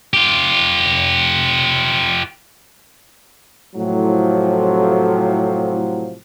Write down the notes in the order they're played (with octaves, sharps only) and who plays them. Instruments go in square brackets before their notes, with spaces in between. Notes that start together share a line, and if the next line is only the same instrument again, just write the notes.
[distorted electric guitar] F4 G4
[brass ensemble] A2 C3 F3 F#3